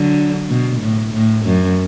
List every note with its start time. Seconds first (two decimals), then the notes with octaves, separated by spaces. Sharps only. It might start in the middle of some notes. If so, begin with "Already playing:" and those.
Already playing: D3 F#3
0.49 B2
0.81 A2
1.14 A2
1.46 F#2